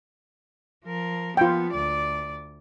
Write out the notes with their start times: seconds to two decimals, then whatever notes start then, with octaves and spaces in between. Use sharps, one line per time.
0.86 F3 A#4
1.37 F3 B3 F4 G5
1.73 D2 D5